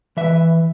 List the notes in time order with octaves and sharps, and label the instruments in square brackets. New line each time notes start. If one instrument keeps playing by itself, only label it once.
[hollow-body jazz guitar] E3 E5